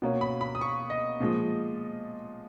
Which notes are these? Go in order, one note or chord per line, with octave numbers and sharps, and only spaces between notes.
B2 A#3 C#4
B5
B5
D#6
C#6
D#5
A#2 F3 G#3